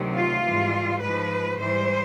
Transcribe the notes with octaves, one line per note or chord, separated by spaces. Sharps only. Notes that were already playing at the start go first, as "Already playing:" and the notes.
Already playing: D2 C3 D#3 F#3
F4
G#2 E3 G3
G#2 F3 B4
G#2 E3 G3 C5